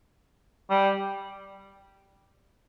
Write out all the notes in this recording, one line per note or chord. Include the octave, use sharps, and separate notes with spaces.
G3